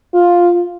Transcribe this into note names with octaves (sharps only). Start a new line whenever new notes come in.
F4